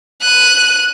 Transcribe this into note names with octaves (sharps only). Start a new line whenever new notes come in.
F#6 D#7